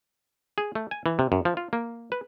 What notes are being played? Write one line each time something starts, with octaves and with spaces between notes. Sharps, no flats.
G#4
A3
G#5
E3
C3
F#2
F3
F4
A#3
B4